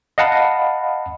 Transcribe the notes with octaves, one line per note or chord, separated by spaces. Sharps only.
D#5 F5 F#5 A5 B5